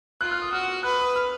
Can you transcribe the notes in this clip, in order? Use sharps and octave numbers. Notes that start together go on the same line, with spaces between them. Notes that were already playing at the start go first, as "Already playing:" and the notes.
F4 F#6
F6
D#6
F#4 F6
B4 F#6
D#6
F6